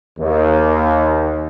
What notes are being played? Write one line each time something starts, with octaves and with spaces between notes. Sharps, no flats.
D#2